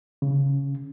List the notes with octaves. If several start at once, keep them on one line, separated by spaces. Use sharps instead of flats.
C#3